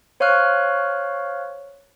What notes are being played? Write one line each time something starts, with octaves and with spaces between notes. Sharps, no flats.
C5 C#5 F5 C#6 F6 F#6